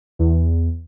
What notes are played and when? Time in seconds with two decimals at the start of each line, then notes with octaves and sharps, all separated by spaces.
0.19 E2